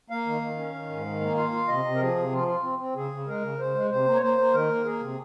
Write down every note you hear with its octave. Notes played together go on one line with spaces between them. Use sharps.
A#3 F5
D#3
D#3
C#4
D#3
G#2
D#3
A#3
F4 F5
F4
C3 D#5
C3
A#4
F3 G#4
C3
F3 F4
F4
C4
C4
C#3 G#4
C#3
G#3 A#4
C#3
C#3 C5
G#3
C3 C5
A#3
C#5
A#3 C5
A#3
D#3 A#4
A#3
A#3 G#4
C3